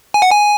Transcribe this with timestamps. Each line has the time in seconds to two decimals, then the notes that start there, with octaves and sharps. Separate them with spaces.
0.14 G#5
0.22 F#5
0.31 G#5